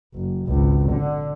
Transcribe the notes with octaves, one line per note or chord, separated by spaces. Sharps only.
F#1
G#1 C#2
D3